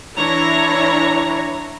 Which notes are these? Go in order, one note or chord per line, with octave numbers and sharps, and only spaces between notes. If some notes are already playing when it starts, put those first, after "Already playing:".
E3 D4 E4 C#5 A#5